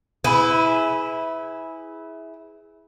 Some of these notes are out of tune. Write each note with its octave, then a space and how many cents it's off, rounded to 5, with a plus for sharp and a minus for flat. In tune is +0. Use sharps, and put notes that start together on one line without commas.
E4 -15 G#4 +0 B4 +30